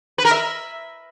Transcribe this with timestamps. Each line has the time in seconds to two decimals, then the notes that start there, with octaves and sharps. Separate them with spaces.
0.18 B4
0.25 A#4
0.31 E5